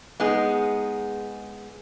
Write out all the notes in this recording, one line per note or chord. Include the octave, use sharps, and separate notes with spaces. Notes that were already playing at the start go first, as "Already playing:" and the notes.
G#3 B3 D#4 G#4